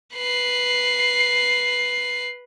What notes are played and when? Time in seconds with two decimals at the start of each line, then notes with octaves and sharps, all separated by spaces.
0.16 B4 C7